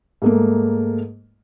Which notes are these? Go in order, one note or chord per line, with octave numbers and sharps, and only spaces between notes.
G#2 A3 A#3